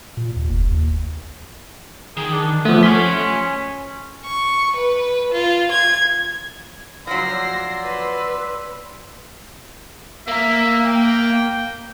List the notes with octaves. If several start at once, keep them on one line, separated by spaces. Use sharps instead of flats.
A#2
D#2
F1
D#2
D#3 G#4
D4
F3 A3 B3
C#4 G#5 C6 B6
C#6
B4
F4
G#6
F3 F#3 D5 C6 E6 A#6 C7
B4
A#3 A#4 E5
G5